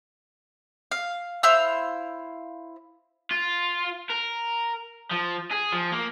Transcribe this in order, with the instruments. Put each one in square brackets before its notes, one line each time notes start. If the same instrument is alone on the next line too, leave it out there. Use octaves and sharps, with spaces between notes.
[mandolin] F5
E4 C5 F5 E6
[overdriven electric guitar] F4
A#4
F3
G#4
F3
A#3